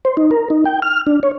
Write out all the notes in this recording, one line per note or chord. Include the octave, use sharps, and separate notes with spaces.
C5
D#4
A#4
D#4
G5
F6
D4
C#5